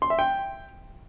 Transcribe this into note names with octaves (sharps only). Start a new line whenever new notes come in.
C6
E5
G5